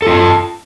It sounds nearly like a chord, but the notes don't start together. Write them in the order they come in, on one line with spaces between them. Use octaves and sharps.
A4 F4 A5